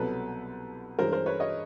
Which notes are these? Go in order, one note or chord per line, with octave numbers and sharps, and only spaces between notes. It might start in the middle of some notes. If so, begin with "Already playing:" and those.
Already playing: C2 B2 F#3 A4 B4
G2 E3 G#3 C#4 A#4 C5
A#4 C5
B4 C#5
C#5 D#5